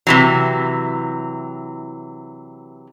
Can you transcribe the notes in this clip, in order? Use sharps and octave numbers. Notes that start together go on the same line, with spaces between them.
C3 E3 F#3